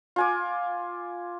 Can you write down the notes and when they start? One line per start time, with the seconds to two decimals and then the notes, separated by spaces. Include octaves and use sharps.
0.16 F4 G#5 D6